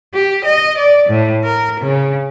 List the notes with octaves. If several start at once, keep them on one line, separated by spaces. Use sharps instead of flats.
G4
D#5
D5
A2
A#4
C#3